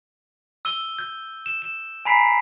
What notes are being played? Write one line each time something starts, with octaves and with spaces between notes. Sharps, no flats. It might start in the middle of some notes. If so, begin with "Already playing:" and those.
E6 D#7 G7
G6
E7
E7
G#5 A#5 B5 B6 C7 D7